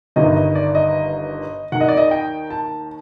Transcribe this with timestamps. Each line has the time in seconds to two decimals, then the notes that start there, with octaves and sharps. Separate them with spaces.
0.16 G1 G2 D#3 D#5
0.36 D#5
0.55 D5
0.75 D#5
1.72 D#2 D#3 F#5
1.80 D#5
1.88 D5
1.97 D#5
2.11 G5
2.50 A5